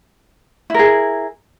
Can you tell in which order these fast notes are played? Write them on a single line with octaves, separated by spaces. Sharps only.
E4 A#4 G#4